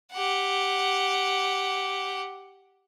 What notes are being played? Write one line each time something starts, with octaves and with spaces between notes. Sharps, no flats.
G4 F#5